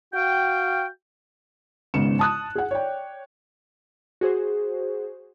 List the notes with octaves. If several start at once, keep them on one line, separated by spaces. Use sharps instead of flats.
F#4 F5 G5
G#1 G#2 C#3 B3 C#7 E7
A5 D#6 F#6
G#4 F#5
C#5 D5 G5
F#4 G#4 C5